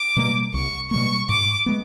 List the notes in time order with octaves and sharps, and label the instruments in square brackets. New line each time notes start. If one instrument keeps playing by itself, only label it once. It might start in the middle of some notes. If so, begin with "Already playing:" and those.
Already playing: [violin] D6
[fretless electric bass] B2 G3 A#3
[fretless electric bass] C2 [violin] C#6
[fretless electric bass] B2 G3 A#3 [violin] C#6
[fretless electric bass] G#2 [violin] D6
[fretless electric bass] G#3 B3